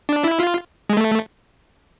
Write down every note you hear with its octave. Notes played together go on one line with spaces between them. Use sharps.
D4
E4
F4
G#3
A3